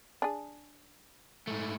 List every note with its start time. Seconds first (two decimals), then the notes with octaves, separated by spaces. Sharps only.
0.22 D4 G#4
1.48 G#2 A3